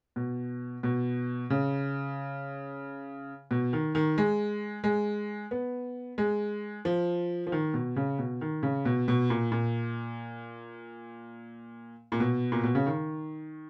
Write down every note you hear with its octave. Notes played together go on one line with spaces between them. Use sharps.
B2
B2
C#3
B2
D#3
D#3
G#3
G#3
B3
G#3
F3
F3
D#3
B2
C#3
B2
D#3
C#3
B2
B2
A#2
A#2
A#2
B2
A#2
B2
C#3
D#3